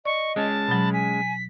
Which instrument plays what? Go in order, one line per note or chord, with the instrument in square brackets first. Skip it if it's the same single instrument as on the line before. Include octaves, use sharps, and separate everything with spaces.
[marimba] D5 [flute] D#5 [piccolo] C#6
[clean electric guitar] G#3 C#4 [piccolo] A5
[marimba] B2 F#3 [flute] B5
[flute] G#5 [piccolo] B6